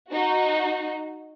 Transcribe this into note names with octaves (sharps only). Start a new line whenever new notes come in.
D#4 F#4